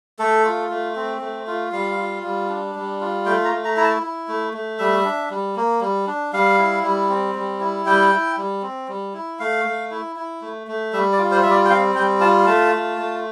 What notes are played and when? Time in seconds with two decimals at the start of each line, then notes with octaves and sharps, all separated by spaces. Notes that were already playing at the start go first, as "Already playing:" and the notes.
0.19 A3 A4
0.45 F4
0.70 A3
0.96 C4
1.21 A3
1.47 F4
1.72 G3 F5
1.98 F4
2.23 G3
2.49 D4
2.75 G3
3.01 F4
3.26 A3 G5
3.45 A#5
3.52 A3
3.65 A#5
3.77 E4 A#5
3.84 A5
4.03 E4
4.28 A3
4.53 A3
4.79 G3 E5
5.05 D4
5.31 G3
5.56 A#3
5.81 G3
6.07 D4
6.33 G3 F5
6.58 E4
6.84 G3
7.10 C4
7.35 G3
7.60 E4
7.86 G3 G5
8.12 E4
8.37 G3
8.62 C4
8.88 G3
9.14 E4
9.39 A3 F5
9.65 A3
9.91 E4
10.16 E4
10.42 A3
10.67 A3
10.93 G3 E5
11.12 D5
11.18 F4
11.31 C5
11.43 G3 E5
11.51 D5
11.65 G5
11.70 C4 F5
11.95 G3 G5
12.20 F4 A5
12.46 A3 A5
12.72 F4
12.98 A3